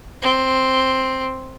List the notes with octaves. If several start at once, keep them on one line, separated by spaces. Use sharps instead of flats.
C4